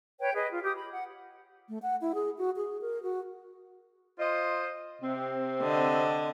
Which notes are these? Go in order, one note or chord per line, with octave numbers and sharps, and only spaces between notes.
B4 C#5 G5
G#4 B4 D#5
F4
G4 D#6
B5
F#5
A3
F#5
E4
G#4
F#4
G#4
A#4
F#4
F4 C5 D#5
C3 C4
D3 D#5